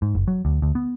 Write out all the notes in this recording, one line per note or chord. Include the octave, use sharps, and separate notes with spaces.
G#2
F#1
F#3
D2
D2
B3